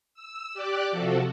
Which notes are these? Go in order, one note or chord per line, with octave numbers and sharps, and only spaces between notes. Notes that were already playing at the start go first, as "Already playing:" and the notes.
E6
G4 D5 D6 F#6
C3 F3 F#4 A4